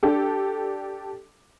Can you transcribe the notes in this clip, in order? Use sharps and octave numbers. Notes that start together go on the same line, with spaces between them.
D4 G4 A4